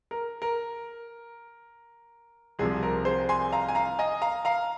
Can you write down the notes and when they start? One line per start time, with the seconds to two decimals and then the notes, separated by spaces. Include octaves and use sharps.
0.11 A#4
0.42 A#4
2.59 C2 C3 F3 G#4
2.83 A#4
3.05 G#4 C5
3.29 G#5 C6
3.52 F5 A#5
3.69 G#5
3.75 F5 A#5
3.99 D#5 G#5
4.22 F5 A#5
4.45 F5 A#5